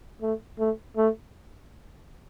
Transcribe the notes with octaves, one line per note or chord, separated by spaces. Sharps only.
A3
A3
A3